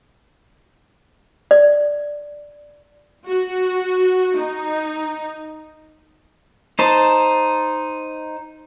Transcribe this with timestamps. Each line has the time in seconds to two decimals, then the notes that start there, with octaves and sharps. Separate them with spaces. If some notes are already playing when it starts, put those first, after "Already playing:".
1.51 D5
3.27 F#4
4.38 D#4
6.79 D#4 C5 A5